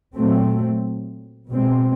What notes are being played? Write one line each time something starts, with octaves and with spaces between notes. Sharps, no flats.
A#2 F#3 A3 C4
B2 G#3 C4